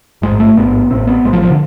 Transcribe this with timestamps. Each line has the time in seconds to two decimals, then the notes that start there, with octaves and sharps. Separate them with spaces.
0.22 A1 G#2 G#3
0.40 A3
0.57 A1 G#2 B3
0.90 A1 A2 C4
1.07 B3
1.24 A1 G#3
1.28 A2 F3
1.42 F3
1.50 D3